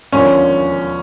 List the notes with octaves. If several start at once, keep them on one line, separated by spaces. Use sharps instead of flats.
E1 D#2 D3 F3 C#4